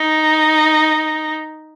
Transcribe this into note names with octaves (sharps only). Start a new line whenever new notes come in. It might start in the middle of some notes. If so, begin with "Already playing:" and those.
Already playing: D#4